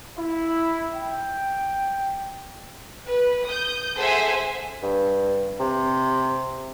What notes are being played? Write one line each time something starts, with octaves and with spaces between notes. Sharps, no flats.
E4
G5
B4
D#6 G6
G#4 A4 C5 E5 F#5 G#5
G2
C3